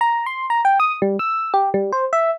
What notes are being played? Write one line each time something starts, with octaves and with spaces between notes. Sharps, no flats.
A#5
C6
A#5
G5
D#6
G3
E6
G4
G3
C5
E5